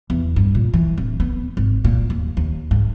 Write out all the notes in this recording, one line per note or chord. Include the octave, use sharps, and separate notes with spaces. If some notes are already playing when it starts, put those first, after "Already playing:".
E2
G2
A#2
E3
D1
B3
G#1
A#2
D#2
D#2
G#2